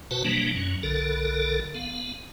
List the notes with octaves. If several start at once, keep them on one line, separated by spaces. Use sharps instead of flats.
B2 F#4 B4 C5 F#5 A5
B2 E3 F#3 G3 A#3 D4
F#2 F#3 C#4
B1 D3 A4 A#4
B3 F5